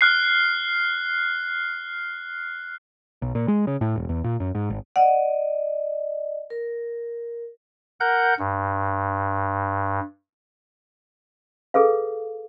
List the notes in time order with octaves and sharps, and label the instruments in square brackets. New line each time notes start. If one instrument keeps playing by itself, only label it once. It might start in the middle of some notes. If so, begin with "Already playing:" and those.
[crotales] F6 F#6 C7
[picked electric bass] B1
A#2
G#3
C#3
A2
E1
E2
A#2
F#2
G#2
G#1
[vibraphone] D5 D#5 [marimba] F#5
[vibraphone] A#4
[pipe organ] A#4 F#5 G6
G2
[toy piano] G#4 A4 B4 F5